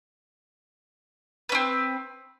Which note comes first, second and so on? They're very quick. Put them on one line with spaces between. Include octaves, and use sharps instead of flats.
B4 C#4 C4